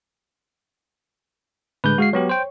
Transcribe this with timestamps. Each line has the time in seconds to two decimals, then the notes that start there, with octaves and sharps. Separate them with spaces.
1.84 A2 D3 G#3 B4 G6
1.98 G#3 F#4 F5 C7
2.13 F#3 B3 G4 C#5
2.29 C5 G5